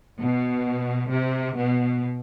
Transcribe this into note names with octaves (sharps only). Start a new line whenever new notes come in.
B2
C3
B2